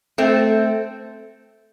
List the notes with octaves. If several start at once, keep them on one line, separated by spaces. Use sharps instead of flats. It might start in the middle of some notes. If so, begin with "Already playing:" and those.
A3 C4